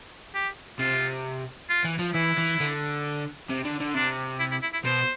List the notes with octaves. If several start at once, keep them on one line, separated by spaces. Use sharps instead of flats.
G4
C3 F4
F4
E3
F3
E3 E4
E3
D3
C3
D3
D3
C3 D4
E4
E4
E4
E4
B2 C5